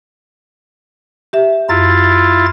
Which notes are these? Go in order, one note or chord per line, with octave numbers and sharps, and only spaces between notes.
G4 E5
F#2 E4 F4 A6